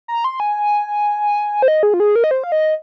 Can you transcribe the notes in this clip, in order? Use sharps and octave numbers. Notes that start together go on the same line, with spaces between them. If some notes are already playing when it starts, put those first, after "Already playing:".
A#5
C6
G#5
C5
D#5
G#4
F4
G#4
A#4
D#5
C5
F5
D#5